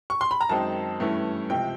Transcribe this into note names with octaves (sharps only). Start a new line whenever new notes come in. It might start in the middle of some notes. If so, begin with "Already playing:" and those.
C#6
C6
B5
A#5
F#2 D#3 G#3 C4 D#4 A5
G2 E3 A3 C#4 E4
C#2 C3 F3 G5